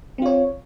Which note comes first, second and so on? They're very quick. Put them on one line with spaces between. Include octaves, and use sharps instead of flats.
C4 F4 C#5